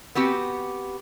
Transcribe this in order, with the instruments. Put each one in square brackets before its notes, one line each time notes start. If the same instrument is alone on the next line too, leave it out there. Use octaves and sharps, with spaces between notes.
[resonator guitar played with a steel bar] B3 C4 F#4 G4